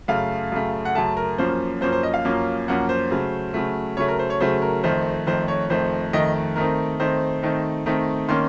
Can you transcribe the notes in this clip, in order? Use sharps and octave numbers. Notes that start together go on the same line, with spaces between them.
F#2 C#3 A3 F5
F#2 C#3 A3
F#5
F#2 C#3 A3 A5
A#4
F#2 F3 A#3 C#4 C5
F#2 F3 A#3 C#4 C5
C5
D#5
F5
F#2 F3 A#3 C#4
F#2 F3 A#3 C#4 F#5
C5
C#3 F#3 A3
C#3 F#3 A3
C#3 F#3 A3 C#5
A#4
C5
C#5
C#3 F#3 A3 C5
A#4
F2 D#3 A3 C5
F2 D#3 A3 C5
C#5
F2 D#3 A3 C5
F2 D#3 A3 D#5
D#3 A3 C4 D#4 A#4
D#3 A3 C4 D#4 C5
D#3 A3 C4 D#4
D#3 A3 C4 D#4
D#3 A#3 C#4 C6